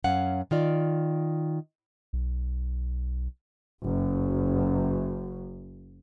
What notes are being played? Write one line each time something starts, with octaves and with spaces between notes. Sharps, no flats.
F#2 C#4 F5 F#5
D#3 F4 D5
B1
F#1 F#2